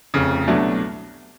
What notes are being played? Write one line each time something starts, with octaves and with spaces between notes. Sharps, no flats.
F1 F2 C#3
C2 B2 F#3 A3 D4